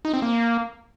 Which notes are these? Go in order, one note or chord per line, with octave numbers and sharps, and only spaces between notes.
D#4
C4
A#3